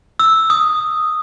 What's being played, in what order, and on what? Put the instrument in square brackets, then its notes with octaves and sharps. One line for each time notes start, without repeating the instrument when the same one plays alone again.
[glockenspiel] E6
D#6